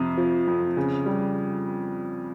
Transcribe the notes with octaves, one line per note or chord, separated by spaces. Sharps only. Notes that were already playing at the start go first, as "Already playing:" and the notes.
Already playing: F2 C3
F3
F2
C#3
G3